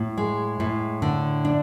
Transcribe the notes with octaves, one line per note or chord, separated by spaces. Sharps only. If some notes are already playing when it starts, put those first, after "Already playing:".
Already playing: A2
G#3
A2
D3
D4